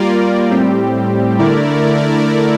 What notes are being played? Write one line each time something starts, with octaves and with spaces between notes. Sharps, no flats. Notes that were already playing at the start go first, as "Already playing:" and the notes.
Already playing: G3 A#3 F4 A#4 D5
A2 G3 C4 G4
D3 A3 E4 A#4 D5